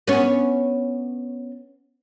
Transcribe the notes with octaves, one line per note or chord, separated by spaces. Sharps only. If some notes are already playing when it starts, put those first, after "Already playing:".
B3 C#4